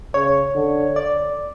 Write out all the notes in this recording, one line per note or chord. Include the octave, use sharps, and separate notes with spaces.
C#3 C#5
D3
D5